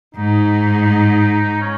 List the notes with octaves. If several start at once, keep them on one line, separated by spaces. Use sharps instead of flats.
G#2 D#4
C#4